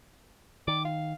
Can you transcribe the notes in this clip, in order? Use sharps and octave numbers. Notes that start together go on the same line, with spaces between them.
D#3 D6
F5